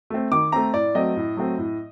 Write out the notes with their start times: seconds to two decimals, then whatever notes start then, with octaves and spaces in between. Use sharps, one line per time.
0.10 A3 C4
0.31 D#3 D6
0.52 A3 C4 A#5
0.74 A2 D5
0.95 F#3 A3 C4 D#5
1.16 A2
1.37 F#3 A3 C4
1.58 A2